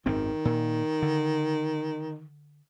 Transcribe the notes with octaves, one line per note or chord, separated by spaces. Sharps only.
G#1 F#2 D#3 C4
A#2
D3